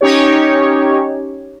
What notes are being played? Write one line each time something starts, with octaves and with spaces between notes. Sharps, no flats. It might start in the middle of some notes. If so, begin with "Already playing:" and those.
C#4 D#4 G4 C#5